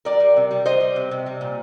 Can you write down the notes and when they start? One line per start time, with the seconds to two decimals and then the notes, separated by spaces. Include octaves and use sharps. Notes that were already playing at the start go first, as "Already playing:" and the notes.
0.05 G3 A#4 D5
0.20 G3
0.36 C3
0.51 G3
0.66 G3 C5 D#5
0.80 G3
0.96 C3
1.11 C3
1.26 G3
1.41 A#2